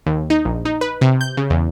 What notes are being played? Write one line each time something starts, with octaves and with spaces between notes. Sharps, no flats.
D#2
D#4
A#1
D#4
B4
C3
G6
C#3
E2